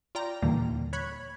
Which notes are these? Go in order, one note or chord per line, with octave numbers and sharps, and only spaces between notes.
F4 D5 G5 A#5
D#2 A#2 D3 E3 G3 A#3
C#5 B5 F#6 G#6